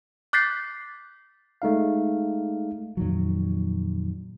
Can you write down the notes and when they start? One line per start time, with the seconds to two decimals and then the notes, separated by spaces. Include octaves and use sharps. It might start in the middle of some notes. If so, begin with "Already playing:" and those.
0.33 D6 F#6 G6 A6 B6 C7
1.62 G#3 A3 D#4 F5
2.97 F2 A#2 D#3 F#3